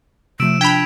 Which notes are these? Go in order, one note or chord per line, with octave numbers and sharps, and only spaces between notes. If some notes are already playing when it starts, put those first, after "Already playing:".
C3 F3 A3 E6 D7 E7
D4 G5 B5 G#6 B6 F7